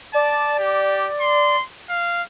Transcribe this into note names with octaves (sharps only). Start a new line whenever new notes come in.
D5 A5
G4
C6
F5